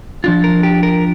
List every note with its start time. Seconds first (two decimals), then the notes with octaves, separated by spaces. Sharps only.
0.24 F3 D4 F4
0.44 A#4
0.63 G4
0.83 A#4